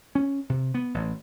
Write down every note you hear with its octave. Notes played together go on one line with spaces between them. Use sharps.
C#4
C3
B3
A1